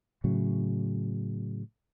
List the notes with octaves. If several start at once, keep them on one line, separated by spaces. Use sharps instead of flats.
A2 C#3 F#3